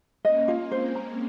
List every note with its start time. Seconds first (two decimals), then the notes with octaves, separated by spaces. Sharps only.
0.24 A#3 C#4 D#5
0.48 F4
0.71 G#3 C4 C5
0.95 A#5